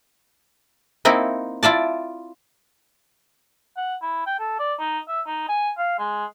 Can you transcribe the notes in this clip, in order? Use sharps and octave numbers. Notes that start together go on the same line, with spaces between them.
A#3 C4 D#4 E4 A#4
E4 F4 D5 A5
F#5
E4
G5
A4
D5
D#4
E5
D#4
G#5
F5
G#3